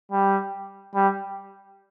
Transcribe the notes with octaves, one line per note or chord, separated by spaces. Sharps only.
G3
G3